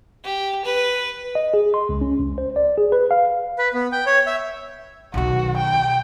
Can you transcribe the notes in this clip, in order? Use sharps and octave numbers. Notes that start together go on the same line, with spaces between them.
G4
B4
D#5
G#4
C6
C#2
C#4
C#2
C5
D5
G#4
B4
F5
B4
B3
G5
C#5
E5
B1 D#3 F#4
G5